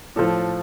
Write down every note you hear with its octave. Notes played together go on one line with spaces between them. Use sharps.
A2 F3 A4